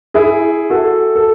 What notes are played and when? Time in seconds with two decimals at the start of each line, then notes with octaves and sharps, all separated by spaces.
0.14 E4 G#4
0.70 F#4 A4
1.15 A4